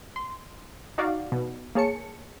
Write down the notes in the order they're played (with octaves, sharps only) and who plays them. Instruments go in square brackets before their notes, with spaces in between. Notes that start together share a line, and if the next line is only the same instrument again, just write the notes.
[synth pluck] C6
D#4 F#4 D5 F5
B2
A#3 G#4 C#5 A5 C#7